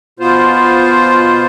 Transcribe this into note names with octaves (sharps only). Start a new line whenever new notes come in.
B2 B3 F4 C5